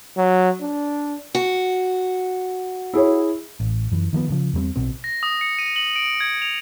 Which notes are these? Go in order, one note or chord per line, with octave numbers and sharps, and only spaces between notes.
F#3
D4
F#4
E4 G#4 C#5
A1
F#2 E3
D#3 F3 A#3 B3
D2 C#3 F3
E2 G2 G3 C4
B1 B2 C4
A#6
D#6
C#7
D#7
F#7
D7
G#6
F7